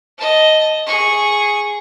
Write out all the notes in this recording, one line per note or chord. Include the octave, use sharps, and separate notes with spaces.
D#5 A5
G#4 C#6